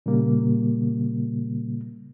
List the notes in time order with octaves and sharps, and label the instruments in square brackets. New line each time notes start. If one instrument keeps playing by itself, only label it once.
[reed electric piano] A#2 C#3 G3 A#3